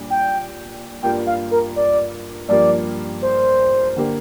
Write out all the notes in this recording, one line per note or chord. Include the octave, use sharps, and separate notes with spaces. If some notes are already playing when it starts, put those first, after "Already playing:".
Already playing: A#2 G3 D4
G5
G2 G3 A#3 F4 G5
F5
A#4
D5
G2 F3 A#3 G4 D5
C5
D3 A#3 G4